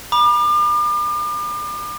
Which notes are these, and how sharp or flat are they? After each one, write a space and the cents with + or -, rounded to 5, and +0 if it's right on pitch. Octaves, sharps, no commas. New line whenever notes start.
B5 -35 D6 +40